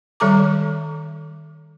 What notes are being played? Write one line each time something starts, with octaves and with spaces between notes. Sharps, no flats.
D#3 G3 A4 A#5 D6